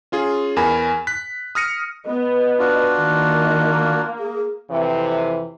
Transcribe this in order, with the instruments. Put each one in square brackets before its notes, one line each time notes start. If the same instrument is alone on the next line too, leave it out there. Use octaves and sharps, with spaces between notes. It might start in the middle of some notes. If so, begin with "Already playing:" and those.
[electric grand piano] C#4 F4 G#4
E2 A#4 G#5 B5
F#6 B6
D#6 F6 A#6 C#7 D#7
[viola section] B3 [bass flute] D#5
[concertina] D4 F4 F#4
[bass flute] D#3 [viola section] A#3
[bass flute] G#4
[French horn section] F2 C3 E3